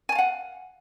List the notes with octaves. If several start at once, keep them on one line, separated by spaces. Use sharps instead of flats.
F5 F#5 G#5 A5